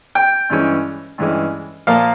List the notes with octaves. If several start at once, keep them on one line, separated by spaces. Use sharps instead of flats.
G5
G2 E3 G#3 C#4
G2 E3 G#3 C#4
A#2 F3 A#3 F5